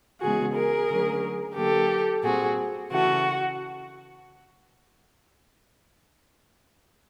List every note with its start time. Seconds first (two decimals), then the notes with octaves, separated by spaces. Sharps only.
0.21 C#3 E3 G#3 B3 F#4 G#4
0.54 G#4 A#4
0.88 D3 F#3 A3 C#4
1.55 D3 F#3 A#3 G4 A4
2.22 A#2 G3 C4 F#4 G#4
2.90 C#3 E3 A3 F#4